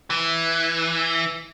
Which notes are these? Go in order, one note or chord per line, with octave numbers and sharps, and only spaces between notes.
E3